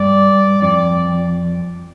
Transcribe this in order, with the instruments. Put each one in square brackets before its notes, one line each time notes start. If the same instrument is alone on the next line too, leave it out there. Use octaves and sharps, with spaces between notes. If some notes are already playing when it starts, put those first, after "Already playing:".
Already playing: [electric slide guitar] G2 [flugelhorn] D5
[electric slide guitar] F2 [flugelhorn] D5